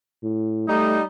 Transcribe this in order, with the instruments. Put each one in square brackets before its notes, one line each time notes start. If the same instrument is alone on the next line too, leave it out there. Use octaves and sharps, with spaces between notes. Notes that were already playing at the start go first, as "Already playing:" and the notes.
[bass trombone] A2
[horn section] G3 D#4 [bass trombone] A3